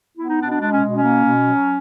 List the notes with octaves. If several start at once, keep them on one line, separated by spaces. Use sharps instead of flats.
B3 E4
D#4
B2 D4
D4
G#3 D4
C#4
B2
C#4
A#3
B2
F#3